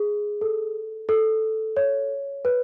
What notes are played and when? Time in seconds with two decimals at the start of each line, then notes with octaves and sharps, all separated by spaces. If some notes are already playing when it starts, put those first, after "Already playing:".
Already playing: G#4
0.41 A4
1.09 A4
1.77 C#5
2.45 B4